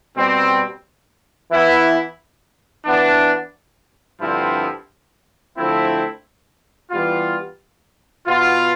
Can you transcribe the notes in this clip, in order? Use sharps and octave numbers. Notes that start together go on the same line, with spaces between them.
B2 G3 C4
E3 B3 E4
E3 B3 D4
G2 D3 F3 C4 E4
D3 F3 A3 C4 E4
E3 G3 B3 F4
B2 B3 F4